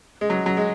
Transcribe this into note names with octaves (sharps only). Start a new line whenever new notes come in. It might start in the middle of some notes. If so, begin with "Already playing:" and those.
G#3
F#3
F#3
G#3